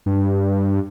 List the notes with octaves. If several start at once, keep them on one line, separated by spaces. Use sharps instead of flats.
G2